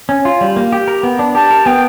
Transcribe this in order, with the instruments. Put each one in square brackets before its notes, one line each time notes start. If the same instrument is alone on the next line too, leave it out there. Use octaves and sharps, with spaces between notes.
[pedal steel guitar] C#4
F4
G3
A#3
G4
A#4
B3
D4
[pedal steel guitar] G4 [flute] A5
[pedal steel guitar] A#4
[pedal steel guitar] B3 [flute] G5